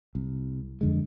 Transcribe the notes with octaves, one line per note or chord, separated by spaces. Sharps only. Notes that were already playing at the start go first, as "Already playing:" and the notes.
C2
F2 D3 G#3